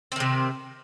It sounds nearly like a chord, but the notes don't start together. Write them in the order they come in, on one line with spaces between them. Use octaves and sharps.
C4 D#3 C3